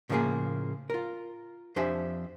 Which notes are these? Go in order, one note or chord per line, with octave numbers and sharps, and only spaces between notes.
A2 C#3 F3 G#3 A#3 G#4
F4 A#4
F2 D4 G4 C5 E5 G#5